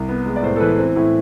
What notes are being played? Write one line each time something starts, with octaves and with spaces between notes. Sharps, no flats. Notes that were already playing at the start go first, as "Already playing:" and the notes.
Already playing: C2
B3
G#3
D5
A2 C5
A4
E3 B4
C4
A2